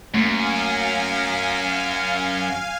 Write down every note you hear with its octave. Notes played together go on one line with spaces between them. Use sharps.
F#2 A3 A#3 F5 G#5